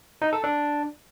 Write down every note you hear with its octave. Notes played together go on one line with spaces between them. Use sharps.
D#4
A4
D4